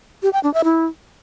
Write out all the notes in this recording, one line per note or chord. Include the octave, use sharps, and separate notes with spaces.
G4
G5
D4
E5
E4